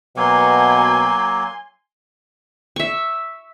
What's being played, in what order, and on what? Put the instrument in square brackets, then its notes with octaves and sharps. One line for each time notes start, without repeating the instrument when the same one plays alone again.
[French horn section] B2 [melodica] F#3 A#3 [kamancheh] G#5 C6
[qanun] E5 C#6